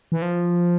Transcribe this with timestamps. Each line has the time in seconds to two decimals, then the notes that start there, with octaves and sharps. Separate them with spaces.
0.12 E3
0.22 F3